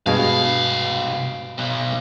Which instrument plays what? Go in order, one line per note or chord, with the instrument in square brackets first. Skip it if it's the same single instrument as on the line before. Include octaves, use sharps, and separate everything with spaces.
[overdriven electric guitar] C2 F5 [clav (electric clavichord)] G2 B2 G#3
[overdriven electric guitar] B1